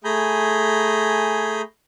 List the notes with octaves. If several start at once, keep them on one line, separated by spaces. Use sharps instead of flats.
A3 G#4 G#5 A#5 B5 G6